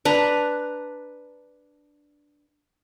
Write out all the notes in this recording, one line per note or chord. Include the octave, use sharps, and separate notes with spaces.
D4 B4 A#5